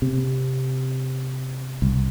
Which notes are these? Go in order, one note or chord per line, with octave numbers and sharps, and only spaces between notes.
C3
C2